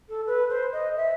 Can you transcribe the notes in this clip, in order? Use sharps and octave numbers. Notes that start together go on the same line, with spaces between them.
A4
B4
C5
D#5
E5